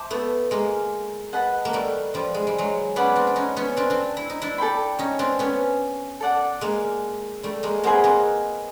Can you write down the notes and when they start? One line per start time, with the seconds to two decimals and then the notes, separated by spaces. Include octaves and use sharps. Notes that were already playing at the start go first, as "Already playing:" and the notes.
Already playing: C5 E5 A5 D6
0.10 A3 B3
0.51 G#3 A#3
1.33 B4 D#5 F#5 A5
1.65 A#3
1.73 G3 A3
2.14 F3 G3
2.34 G#3
2.47 G3
2.58 F#3 G#3
2.96 B3 C#4 B4 D5 F#5 B5
3.16 C4 D4
3.27 D4
3.36 C#4 D#4
3.56 B3 C#4
3.77 C4 D4
3.90 C4 D4
4.17 E4
4.30 D#4
4.42 D4 E4
4.58 A4 D5 G5 B5
4.99 C#4 D#4
5.19 C4 D4
5.39 B3 C#4
6.21 A4 D5 F#5
6.61 G#3 A#3
7.43 G3 A3
7.63 G#3 A#3
7.84 A#3 C4 G#4 B4 D#5 F#5
8.04 A#3 C4